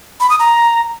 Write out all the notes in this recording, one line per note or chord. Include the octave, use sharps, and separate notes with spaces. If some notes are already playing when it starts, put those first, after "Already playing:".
B5
D#6
A#5